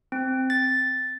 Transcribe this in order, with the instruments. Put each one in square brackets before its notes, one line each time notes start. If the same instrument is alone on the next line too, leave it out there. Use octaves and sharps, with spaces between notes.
[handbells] C4
A6